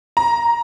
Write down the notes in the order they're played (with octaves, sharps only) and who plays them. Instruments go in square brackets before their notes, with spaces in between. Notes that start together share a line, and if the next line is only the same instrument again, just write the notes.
[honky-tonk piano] A#5